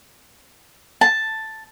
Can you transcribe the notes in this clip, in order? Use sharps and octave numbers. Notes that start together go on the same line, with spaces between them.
A5